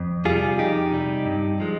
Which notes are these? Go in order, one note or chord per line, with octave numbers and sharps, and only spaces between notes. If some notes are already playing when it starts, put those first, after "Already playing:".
Already playing: F2
C3 G3 F4 G#4
F2 D#4 G4
C3 G3
G2
F3 G#3